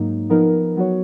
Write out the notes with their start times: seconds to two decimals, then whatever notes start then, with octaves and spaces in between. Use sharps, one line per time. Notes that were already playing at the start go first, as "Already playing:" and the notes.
Already playing: G#2 F#3 A#3 D#4
0.30 F3 B3 D#4 A#4
0.76 F#3 B3 F#4 C#5